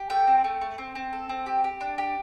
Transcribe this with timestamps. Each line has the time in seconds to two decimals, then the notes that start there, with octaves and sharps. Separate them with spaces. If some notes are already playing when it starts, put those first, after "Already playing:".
Already playing: G4
0.10 A3 G5
0.27 C4
0.44 A3
0.61 A3
0.78 C4
0.95 C4
1.13 A4
1.29 C4
1.46 G4
1.64 G4
1.81 D4
1.98 G4